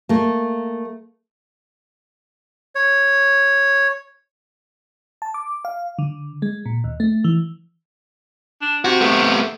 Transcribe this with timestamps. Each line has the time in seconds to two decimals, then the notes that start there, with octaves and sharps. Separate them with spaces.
0.09 A3 A#3
2.75 C#5
5.22 A5
5.34 D6
5.65 F5
5.99 D3
6.42 G#3
6.66 A#2
6.84 D#2
7.00 A3
7.24 E3
8.62 D4
8.85 C3 F#4
9.01 A3 B3